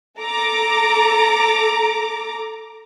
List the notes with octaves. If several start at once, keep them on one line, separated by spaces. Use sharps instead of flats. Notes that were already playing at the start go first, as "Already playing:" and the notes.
A4 A#5 D6